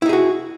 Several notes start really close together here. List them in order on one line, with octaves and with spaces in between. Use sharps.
E4 D#4 G#4 F#4